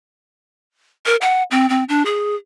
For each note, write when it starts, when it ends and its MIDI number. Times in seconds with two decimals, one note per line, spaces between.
1.06 1.16 70
1.21 1.43 78
1.51 1.68 60
1.69 1.84 60
1.89 2.03 62
2.05 2.35 68